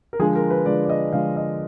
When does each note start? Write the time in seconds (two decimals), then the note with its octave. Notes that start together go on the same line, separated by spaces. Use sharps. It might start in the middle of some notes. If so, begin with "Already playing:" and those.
0.13 A#4
0.19 D3 F3 G#3 G#4
0.35 A#4
0.50 B4
0.66 D3 F3 G#3 D5
0.85 D5
0.89 D#5
1.13 D3 F3 G#3 F5
1.37 D#5